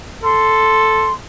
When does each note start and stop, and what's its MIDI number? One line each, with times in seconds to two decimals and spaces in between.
0.24 1.13 69
0.24 1.13 84